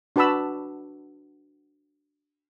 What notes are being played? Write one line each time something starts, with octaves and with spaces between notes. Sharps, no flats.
D4 F#4 B4 A5 B5 E6